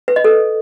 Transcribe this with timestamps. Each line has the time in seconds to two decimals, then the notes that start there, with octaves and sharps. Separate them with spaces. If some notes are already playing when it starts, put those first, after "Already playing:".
0.08 B4
0.16 D#5
0.24 A4